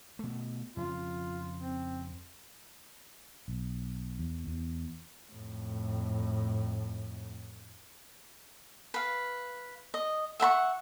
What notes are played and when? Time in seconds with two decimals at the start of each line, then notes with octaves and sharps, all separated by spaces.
0.19 B2 A3
0.77 F2 C#3 F4
1.59 C4
3.48 B1
4.19 E2
4.47 E2
5.32 F2 A2
8.94 B4 F5
9.94 D#5
10.40 E5 F#5 B5 C#6